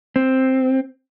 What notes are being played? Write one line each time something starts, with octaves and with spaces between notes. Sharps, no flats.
C4